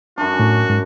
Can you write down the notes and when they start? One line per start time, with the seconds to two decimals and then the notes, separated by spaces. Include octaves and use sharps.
0.18 F#2 D4 F#4
0.39 A2
0.70 G#2